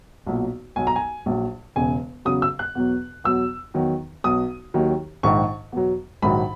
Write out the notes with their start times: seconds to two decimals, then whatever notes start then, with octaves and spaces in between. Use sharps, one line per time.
0.26 B1 A#2 F#3
0.76 B1 B2 F#3 G#5
0.87 A#5
0.96 G#5
1.26 A#1 A#2 F#3
1.76 E1 E2 C#3 G#5
2.25 E2 C#3 F#3 D#6
2.42 E6
2.59 F#6
2.75 E2 B2 F#3
3.24 E2 B2 F#3 E6
3.74 E2 D#3 F#3
4.24 B1 B2 F#3 D#6
4.74 D#2 D#3 F#3
5.23 A#1 G#2 D#3 C#6
5.72 E2 B2 F#3
6.22 A#1 G#2 D#3 F#3 B5